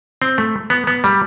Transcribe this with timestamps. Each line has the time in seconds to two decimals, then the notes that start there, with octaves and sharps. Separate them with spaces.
0.22 C4
0.38 A3
0.70 B3
0.87 B3
1.04 G3